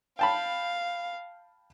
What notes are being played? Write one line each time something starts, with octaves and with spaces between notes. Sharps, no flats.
F5 G5 A5 B5